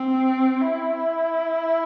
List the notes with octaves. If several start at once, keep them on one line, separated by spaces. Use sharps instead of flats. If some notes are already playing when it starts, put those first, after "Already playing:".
Already playing: C4
E4